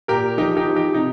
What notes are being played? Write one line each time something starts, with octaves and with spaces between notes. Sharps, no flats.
A#2 G4 A#4
F3 D#4 G4
D#4 G4
F3
D#4 G4
C3 D#4